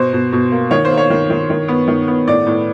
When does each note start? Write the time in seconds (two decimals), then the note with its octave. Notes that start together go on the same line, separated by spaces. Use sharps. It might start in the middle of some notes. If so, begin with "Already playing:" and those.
Already playing: B2 C5
0.13 B2
0.33 B2
0.52 A#3
0.71 D#3 C#5
0.85 C5
0.91 A#3
0.97 C#5
1.10 D#3
1.30 D#3
1.50 D#3
1.68 B3
1.88 D#3
2.08 B3
2.27 A2 D5
2.47 A2